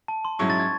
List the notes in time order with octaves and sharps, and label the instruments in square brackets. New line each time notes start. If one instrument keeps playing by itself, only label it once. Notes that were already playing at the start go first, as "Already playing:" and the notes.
[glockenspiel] A5
C6
[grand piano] G#2 F#3 C#4 E4 [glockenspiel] C#6
[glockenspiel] A6
G#6